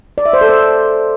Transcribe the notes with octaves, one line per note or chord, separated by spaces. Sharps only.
D5
E5
C5
A4
C5